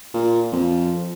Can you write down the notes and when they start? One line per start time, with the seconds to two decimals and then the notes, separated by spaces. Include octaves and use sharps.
0.14 A#2
0.52 F2